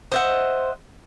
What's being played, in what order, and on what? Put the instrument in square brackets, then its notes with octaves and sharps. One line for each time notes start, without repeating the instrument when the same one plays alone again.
[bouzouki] C5 [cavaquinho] D#5 E5 F#5